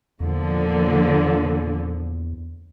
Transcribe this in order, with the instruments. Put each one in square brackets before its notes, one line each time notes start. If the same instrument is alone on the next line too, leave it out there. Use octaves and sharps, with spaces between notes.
[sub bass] E2 [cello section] A#2 D3 F3